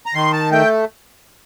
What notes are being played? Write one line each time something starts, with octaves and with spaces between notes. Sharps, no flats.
A#5
D#3 C6
A5
A3 G5